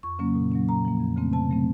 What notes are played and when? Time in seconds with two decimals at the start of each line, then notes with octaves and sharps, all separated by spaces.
0.03 F2 C#6
0.19 C#3 F#3 A#3 C#4
0.35 A#2
0.52 F#3 A#3 C#4
0.68 A#2 A#5
0.85 F3 A#3
1.00 F2
1.16 C#3 A3 C4
1.33 C3 A5
1.50 F#3 A3 C4